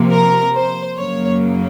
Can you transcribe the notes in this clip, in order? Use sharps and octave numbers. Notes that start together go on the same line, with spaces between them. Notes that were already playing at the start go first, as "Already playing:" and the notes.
Already playing: C3 F3 A#3
A#4
C5
F#2 C#3 F#3 A#3 C#5